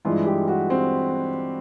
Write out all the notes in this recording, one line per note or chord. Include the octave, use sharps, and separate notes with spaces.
G2 E3 G#3 F4
G4
F#4
C4